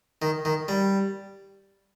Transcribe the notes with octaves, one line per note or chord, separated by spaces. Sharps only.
D#3
D#3
G3